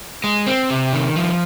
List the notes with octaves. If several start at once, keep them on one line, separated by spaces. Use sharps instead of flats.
G#3
C4
C3
D#3
F3